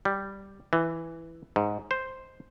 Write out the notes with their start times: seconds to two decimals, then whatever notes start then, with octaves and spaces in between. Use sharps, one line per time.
0.05 G3
0.73 E3
1.56 G#2
1.91 C5